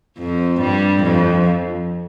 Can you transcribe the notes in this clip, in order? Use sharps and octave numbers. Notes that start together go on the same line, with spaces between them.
F2 F3
G2 G3
F2 F3